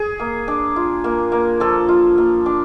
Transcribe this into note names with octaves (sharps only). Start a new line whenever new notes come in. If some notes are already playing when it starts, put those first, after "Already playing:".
Already playing: G#4
A#3
D4
F4
A#3
A#3
F3 A4
F4
A#3
D4